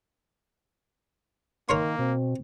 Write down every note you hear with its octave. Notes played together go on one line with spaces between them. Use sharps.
D#3 A#3 A#4 C#5 C6
B2 C4